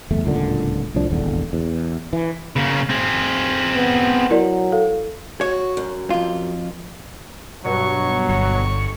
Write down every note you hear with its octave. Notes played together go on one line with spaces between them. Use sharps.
F#1 E2 A3
D1 C#2 A#2 D3
C2 A2 F3 D4
D#1 G#1 E2 D3
E2
E3
C#3 A#3
C4 G#4
B3
F#3 E4 A#4 D5
A4 F5
F#4 C#5
F#2
F2 F4
G2 B2 F#3 C#6
G1 C#6